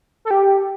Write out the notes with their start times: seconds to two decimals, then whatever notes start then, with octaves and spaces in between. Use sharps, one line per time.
0.25 A4
0.31 G4